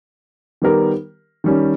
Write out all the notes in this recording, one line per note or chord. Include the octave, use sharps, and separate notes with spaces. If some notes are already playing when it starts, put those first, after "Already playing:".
D#3 G3 B3 G4 A#4
D#3 G3 C#4